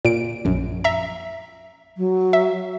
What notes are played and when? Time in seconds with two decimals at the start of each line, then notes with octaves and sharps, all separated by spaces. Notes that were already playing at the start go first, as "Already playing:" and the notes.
0.05 A#2 D7
0.45 A#1 F#2
0.84 E5 A#5
1.97 F#3
2.33 E5